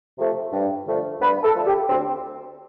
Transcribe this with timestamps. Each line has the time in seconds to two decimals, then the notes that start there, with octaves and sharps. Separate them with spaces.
0.18 C3 F3 A3
0.52 G2
0.87 D3 F3 A3
1.21 G2 B4
1.43 A4
1.54 D3 F3 A3
1.66 G4
1.88 D2 C4